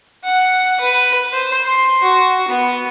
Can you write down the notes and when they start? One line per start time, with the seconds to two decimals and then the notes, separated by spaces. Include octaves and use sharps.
0.24 F#5
0.81 B4
1.33 C5
1.66 C6
2.03 F#4
2.49 B3